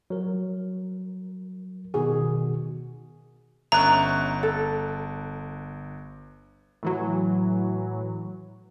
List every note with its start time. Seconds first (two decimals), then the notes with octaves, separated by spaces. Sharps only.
0.10 F#3 A#4
1.94 B2 D#3 F#4 G#4
3.72 G1 C#4 E5 A#5 F#6
4.43 A4
6.83 A2 E3 F#3